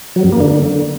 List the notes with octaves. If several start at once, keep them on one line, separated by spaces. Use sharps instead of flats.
F#3
F#2
A#3
D3